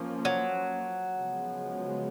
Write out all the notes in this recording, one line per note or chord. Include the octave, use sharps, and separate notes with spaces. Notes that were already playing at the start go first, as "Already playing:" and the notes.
Already playing: F3 A#3 C#4
F#3
C#3 F3 G#3 B3